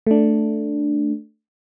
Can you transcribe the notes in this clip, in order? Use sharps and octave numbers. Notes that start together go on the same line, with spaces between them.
A3 D4